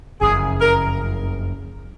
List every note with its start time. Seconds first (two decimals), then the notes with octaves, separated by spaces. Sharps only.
0.21 F#1 F2 C#3 G#4
0.61 A#4